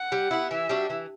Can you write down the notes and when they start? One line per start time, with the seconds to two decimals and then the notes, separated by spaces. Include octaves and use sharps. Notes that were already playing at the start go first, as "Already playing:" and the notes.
Already playing: F#5
0.12 G3
0.31 B3 E4
0.51 E3 E5
0.69 G3 D4 F#4
0.90 E3